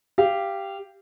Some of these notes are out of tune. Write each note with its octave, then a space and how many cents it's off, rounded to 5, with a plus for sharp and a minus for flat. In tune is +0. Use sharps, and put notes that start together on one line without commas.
G4 +0 F5 -25